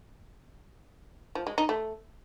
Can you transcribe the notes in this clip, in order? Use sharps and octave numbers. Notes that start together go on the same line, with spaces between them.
F3
G#3
D#4
A3